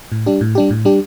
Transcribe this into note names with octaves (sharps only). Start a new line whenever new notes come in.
A2
G3 D4 G4
A2
G3 D4 G4
A2
G3 D4 G4